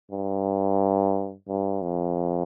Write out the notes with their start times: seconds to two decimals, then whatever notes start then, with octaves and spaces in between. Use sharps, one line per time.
0.11 G2
1.48 G2
1.82 F2